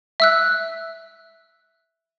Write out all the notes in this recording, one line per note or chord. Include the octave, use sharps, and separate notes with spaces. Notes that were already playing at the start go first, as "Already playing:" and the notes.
E5 E6 F#6